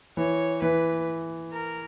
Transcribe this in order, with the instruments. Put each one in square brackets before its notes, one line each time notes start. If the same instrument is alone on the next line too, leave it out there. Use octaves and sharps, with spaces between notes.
[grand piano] E3 [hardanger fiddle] C#5
[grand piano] E3 [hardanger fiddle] B4
[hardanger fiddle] A#4